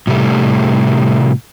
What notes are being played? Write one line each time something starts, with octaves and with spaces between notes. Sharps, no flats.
A2 C3 G3 A3